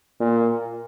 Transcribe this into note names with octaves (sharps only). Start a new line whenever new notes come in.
A#2